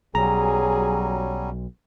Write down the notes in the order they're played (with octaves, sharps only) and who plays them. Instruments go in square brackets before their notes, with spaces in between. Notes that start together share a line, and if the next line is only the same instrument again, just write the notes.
[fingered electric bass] B1 [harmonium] F#3 G3 C#4 [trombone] G#4 [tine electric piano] A#5